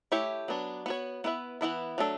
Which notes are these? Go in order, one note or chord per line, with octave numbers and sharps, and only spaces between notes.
A3 E4 G4 C#5 E5
F#3 B3 D4
B3 F#4 C#5
B3 E4 B4 E5
E3 G3 B3 E4 B4
F#3 A3 D4 A4